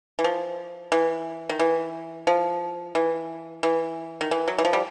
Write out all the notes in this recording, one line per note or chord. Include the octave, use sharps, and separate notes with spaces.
E3
F3
E3
D#3
E3
F3
E3
E3
D#3
E3
F#3
E3
F3
G3